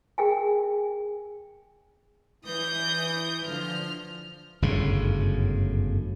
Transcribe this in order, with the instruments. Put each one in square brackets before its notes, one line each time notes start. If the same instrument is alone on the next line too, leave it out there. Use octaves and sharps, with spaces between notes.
[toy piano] G#4 A#4 G5 G#5
[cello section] E3 [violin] D#6 G6
[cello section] D3 F3 [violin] F6
[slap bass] G1 F#2 A2 C#3